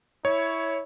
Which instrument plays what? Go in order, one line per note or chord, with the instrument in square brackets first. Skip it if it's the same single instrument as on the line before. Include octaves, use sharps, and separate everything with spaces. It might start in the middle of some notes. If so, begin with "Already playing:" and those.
[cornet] E4 [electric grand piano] C#5